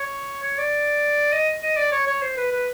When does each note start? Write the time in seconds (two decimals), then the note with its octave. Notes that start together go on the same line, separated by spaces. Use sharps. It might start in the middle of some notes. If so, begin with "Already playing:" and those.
Already playing: C#5
0.43 C#5
0.58 D5
1.33 D#5
1.62 D#5
1.77 D5
1.92 C#5
2.07 C#5
2.22 C5
2.37 B4
2.52 B4